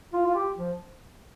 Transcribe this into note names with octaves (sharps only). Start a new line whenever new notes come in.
F4
F4
G4
F3